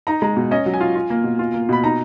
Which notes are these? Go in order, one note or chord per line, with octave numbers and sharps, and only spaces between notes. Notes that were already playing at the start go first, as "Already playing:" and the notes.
D#4 A#5
G#3 A#5
B2
C#4 D#5
F#3
G#5
F4
F4
A#3
B2
F4
A#3
B2 B5
D#4 A#5